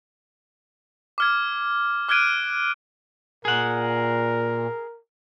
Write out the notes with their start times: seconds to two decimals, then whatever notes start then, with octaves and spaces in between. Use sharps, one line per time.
1.18 D6 F6 G#6
2.08 D6 F6 F#6 G#6 D7 D#7
3.45 A#2 G#4 A#4 F#5